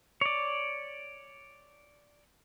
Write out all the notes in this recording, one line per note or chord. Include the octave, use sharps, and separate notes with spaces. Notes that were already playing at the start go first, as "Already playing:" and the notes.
C#5 D5